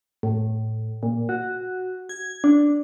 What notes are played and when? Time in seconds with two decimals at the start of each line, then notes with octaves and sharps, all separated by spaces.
0.23 A2
1.03 A#2
1.29 F#4
2.09 G#6
2.44 D4